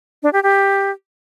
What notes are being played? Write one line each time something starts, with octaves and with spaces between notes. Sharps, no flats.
D4
G4
G4